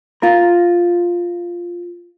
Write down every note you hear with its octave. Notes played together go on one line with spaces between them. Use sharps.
F4 A#4